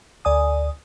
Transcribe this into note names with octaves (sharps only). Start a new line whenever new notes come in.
D2 D5 G#5 D#6